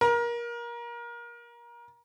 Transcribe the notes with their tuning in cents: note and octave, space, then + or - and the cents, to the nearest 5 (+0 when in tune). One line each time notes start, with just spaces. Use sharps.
A#4 +25